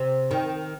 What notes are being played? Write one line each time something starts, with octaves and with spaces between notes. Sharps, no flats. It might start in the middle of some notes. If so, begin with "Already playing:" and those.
Already playing: C3
D#3